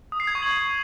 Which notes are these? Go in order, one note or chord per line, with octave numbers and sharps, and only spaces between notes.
D#6
C7
G#6
C#6
F#7